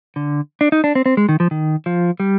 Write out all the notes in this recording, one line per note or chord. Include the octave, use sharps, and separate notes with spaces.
D3
D4
D#4
D4
C4
C4
G#3
D#3
F3
D#3
F3
G3